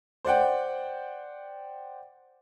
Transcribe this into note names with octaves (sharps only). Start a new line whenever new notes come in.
C5 D5 F#5 G5